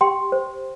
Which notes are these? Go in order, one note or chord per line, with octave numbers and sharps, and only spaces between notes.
G4 G5 C6
C5